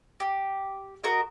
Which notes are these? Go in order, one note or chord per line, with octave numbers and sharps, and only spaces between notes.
G4
F#4 A#4 D#5